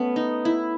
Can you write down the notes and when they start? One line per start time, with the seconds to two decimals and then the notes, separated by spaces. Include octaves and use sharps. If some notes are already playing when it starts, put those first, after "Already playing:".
Already playing: A3 B3 C#4
0.16 D#4
0.45 E4